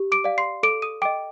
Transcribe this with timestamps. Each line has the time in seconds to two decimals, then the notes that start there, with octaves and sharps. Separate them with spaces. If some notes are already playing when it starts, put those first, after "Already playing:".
Already playing: G4
0.12 D6 D7
0.24 D5 F5
0.38 C6 C7
0.63 A4 D6 D7
0.82 D#6 D#7
1.02 D#5 G5 D6 D7